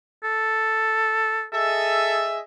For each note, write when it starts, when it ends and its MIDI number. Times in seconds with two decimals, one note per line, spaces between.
0.24 1.45 69
1.53 2.38 68
1.53 2.27 69
1.53 2.38 75
1.53 2.38 76